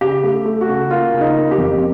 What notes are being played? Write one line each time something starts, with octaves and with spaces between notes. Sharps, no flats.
C#3 G4
A3
A3
F#4
C#3
A#3 F4
C#3
D#4
A#3
G4
F2